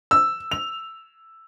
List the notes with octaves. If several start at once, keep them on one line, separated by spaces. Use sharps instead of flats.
E6
F7